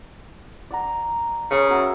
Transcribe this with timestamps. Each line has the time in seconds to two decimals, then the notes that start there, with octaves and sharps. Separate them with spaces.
0.71 D5 F#5 A#5
1.51 C#3 C#4 A#4
1.70 F#4 A#4 E5